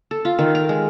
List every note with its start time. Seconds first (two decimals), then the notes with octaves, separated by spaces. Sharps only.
0.11 A4
0.25 F4
0.39 D#3
0.55 A#4
0.69 G#3